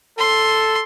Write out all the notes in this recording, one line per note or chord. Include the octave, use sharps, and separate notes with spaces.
A4 C6